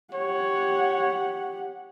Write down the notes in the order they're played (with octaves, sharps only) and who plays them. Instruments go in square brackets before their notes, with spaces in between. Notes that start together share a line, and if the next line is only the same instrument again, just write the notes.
[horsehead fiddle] G4 F#5 [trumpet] C#5